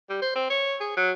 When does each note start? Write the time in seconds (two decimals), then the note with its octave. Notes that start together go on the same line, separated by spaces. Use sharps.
0.10 G3
0.22 C5
0.35 C4
0.50 C#5
0.80 G#4
0.97 F#3